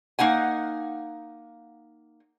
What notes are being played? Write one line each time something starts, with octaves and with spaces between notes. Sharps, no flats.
A#3 D#4 F#5 G#5